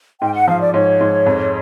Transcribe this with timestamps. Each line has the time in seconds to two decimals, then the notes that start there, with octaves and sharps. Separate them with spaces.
0.21 G#2 G5
0.34 F#5
0.48 F3 F5
0.61 D5
0.74 G#2 C#5
1.01 G#2
1.26 F2